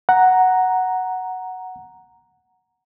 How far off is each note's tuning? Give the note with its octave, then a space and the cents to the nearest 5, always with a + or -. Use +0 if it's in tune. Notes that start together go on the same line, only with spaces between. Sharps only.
F#5 +0 A#5 +0